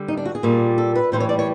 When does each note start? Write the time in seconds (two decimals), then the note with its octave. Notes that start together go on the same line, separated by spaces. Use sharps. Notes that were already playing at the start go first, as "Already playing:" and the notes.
Already playing: D3 G3
0.08 D#4
0.17 D4
0.25 F#4
0.35 G#4
0.43 A#2 G3
0.78 A4
0.96 B4
1.12 A2 E3 G3 C5
1.20 C#5
1.29 D5
1.39 C#5